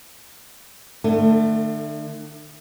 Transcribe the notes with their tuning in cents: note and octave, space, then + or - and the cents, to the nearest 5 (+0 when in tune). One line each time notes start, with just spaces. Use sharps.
D3 +45 A3 +15